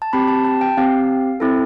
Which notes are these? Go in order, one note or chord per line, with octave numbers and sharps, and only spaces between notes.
A5
C4 G4 B5
A5
A5
G5
C4 G4 F5
C4 E4 A4